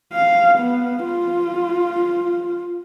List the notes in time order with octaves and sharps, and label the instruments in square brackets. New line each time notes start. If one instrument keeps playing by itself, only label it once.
[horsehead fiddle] F5
B3
F4